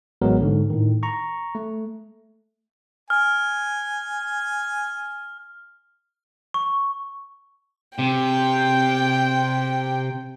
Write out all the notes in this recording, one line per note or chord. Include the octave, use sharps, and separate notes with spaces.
A1 F#3 G#3 B3 A#4
G#2 D3
A2 D#3
A#5 C#6
A3
G#5 F6
C#6
C3 G5